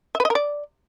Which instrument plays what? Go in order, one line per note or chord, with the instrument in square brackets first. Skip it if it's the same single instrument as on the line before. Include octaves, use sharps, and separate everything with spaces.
[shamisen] E5
B4
D#5
A#4
D5